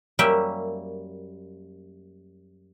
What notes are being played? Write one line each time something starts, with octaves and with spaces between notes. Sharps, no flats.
F#2 G3 A#3 C#4 E5 G5